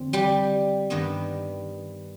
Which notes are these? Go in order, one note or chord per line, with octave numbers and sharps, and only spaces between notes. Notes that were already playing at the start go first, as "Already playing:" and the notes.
Already playing: F2 D3 C4
G3 G4
G2 D#3 G3 B3 D4